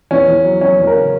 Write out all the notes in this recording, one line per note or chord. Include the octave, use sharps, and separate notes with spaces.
E2 C#4
E2
F#3
F#3 C#4
E2
A#4
C#3